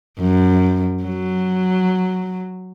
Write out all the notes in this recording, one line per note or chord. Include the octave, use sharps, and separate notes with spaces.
F#2
F#3